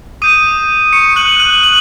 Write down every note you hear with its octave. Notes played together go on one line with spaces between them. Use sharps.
D6 D#6 G6 D#7
C#6 C#7
F#6 F#7
F#6 F#7
F#6 F#7